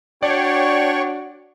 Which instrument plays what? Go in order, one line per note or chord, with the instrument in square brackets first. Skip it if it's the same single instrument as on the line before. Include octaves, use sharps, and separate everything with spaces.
[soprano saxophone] D4 [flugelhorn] F#4 [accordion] C#5 G5 C#6 [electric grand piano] D5